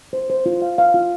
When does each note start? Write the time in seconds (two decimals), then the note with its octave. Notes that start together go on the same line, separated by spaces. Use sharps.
0.13 C5
0.30 C5
0.46 F4
0.62 F5
0.78 F5
0.94 F4